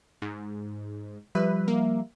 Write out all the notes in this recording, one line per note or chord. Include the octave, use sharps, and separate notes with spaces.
G#2
F3 G3 B4 E5
A#3